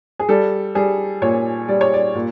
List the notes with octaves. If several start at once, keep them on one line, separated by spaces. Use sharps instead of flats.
G#4
G3 A4
G3 G#4
A#2 C#5
G3 D5
C#5
D5
A#2